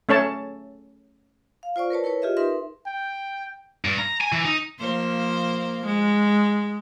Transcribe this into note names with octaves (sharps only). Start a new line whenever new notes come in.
A3 C#4 C#5 A5
F5
F4 C5 D5 C#6
A#4 B4 C#5 A5
E4 A#4 B4 C#5
F4 G4 G#4 D#5 E5
D#4 A#4 B4 E5 C6
G5
G2
A#5
G#5
E3
D#4
F3 A#3 C5
G#3